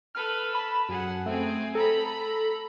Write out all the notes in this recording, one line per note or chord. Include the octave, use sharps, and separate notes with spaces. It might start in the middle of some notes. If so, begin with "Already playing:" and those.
A4 B4 F6
A5 B5
F#2 G#4 F#5
A3 C4 G#4
A4 A#5 B5